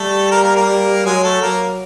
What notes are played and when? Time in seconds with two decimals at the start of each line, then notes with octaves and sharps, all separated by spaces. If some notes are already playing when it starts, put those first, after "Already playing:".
Already playing: G3 A3 A4
0.31 A#3 A#4
0.43 A#3 A#4
0.56 A#3 A#4
1.05 F#3 G#3 G#4
1.24 A3 A4
1.42 F#3 A#3 A#4